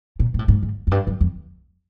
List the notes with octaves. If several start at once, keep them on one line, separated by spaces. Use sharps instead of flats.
A#2
A#2
A2
G#2
G#2
F#2
G2
F#2
F2